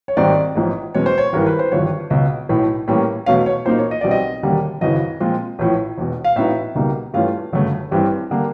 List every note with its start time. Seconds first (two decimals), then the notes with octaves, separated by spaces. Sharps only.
0.08 C#5
0.17 G#1 G#2 D#3 G3 C4 D5
0.56 A1 G#2 F3
0.94 E2 B2 G#3 C#4 C#5
1.06 C5
1.18 C#5
1.33 G#1 G2 E3 A#4
1.46 B4
1.59 C5
1.72 G#1 G2 D3 F3 C#5
2.10 C#2 B2 F#3
2.49 B1 A2 E3 A3
2.88 A2 E3 G3 A#3 C#4
3.26 E2 B2 F#3 A3 C#4 F5
3.46 C#5
3.65 A#2 F#3 A#3 D#4 C5
3.78 C#5
3.91 D#5
4.01 B1 B2 G3 C4 D5
4.11 D#5
4.43 E1 D#2 D3 G3 A#3
4.81 G#1 F#2 C#3 E3 D#5
5.20 A#2 F3 G#3 C4 F4
5.59 A1 A2 F3
5.98 E1 E2 B2
6.24 F5
6.36 A2 F#3 B3 D#4 E5
6.75 C#2 B2 G3 A#3 D#4
7.14 G2 E3 A3 C#4 F4 F5
7.53 G1 F#2 C#3 F#3 A3
7.91 A1 G2 E3 G3 C4
8.31 D3 G3 A#3